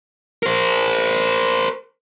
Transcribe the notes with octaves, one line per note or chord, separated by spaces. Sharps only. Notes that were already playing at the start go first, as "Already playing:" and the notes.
A#4 C5